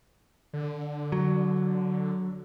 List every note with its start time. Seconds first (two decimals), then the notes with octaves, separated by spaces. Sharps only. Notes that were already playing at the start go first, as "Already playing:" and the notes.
0.53 D3
1.12 F#3